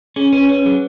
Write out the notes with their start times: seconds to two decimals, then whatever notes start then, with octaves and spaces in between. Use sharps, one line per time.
0.16 C#4 G#4
0.33 C#4 B4
0.44 C#5
0.49 C#4 B4
0.65 F#3 G#4